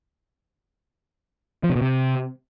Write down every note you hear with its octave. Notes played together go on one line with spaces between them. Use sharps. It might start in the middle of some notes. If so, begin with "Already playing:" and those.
F3
C3
B2
C3